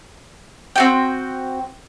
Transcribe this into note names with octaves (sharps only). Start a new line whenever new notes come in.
C4 F#4 G5